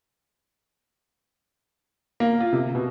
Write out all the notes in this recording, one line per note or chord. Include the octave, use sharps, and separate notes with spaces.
A#3
F4
C3
B2